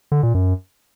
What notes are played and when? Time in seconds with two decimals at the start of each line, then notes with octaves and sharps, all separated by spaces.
0.12 D3
0.23 A#2
0.34 F#2